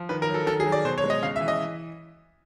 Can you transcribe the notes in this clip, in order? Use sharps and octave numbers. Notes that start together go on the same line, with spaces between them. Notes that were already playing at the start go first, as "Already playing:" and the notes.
Already playing: F3
D#3 B4
A#4
F#3
A4
D#3 A4
G#4
F#3
D5
B2 C5
C#5
G#3
D#5
C#3 F5
E5
E3
D#5